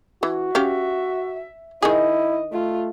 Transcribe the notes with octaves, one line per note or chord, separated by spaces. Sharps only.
E3 F#4
C#4 G4 E5 F5
D#3 E4 G#4 D#5
A3 F4